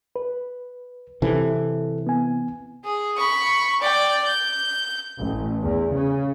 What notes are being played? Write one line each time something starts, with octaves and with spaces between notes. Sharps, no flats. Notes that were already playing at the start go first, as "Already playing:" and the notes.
B4
C3 E3 A4
B3 G#5
G#4
B5 C#6
D5 G5
G6
A1
E2
C#3